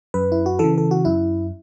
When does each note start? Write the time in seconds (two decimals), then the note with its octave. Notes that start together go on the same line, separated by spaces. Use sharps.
0.14 F#2 B4
0.32 E4
0.46 F#4
0.59 C#3 E3 A4
0.78 A4
0.91 F#4
1.05 F#2 E4